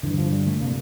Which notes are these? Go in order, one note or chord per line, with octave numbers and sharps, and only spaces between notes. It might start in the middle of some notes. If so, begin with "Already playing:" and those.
G2 D3 E3
F3
G3
A3
C3 A#3